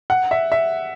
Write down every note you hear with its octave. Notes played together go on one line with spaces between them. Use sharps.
F#5
E5
E5